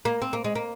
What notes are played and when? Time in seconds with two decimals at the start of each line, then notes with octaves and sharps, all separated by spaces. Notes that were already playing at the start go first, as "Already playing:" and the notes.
0.05 A#3
0.22 C4
0.33 A#3
0.44 G#3
0.55 A#3